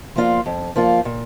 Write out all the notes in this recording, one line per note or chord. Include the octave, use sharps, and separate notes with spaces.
F3 A#3 F4 D5
F2
F3 A#3 F4 D5
A#2